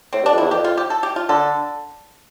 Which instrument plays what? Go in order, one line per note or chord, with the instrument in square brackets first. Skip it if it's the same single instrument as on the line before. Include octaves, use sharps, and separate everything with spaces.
[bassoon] A2 [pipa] C4
[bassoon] G2
[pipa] D4
[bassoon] F2
[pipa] E4
[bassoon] E2
[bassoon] F2 [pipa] G4
[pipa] F4
G4
A4
G4
F4
[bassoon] D3 [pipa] A4